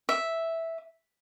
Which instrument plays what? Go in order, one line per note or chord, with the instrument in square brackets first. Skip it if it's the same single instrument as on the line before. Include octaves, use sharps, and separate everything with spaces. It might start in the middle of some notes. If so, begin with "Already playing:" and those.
[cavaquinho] E5